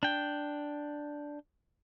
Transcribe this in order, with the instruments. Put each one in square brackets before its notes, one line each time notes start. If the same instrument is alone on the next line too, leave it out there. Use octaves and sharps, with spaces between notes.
[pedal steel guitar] D4 G5